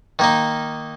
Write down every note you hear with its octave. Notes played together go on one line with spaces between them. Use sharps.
D#3 A#3 D#4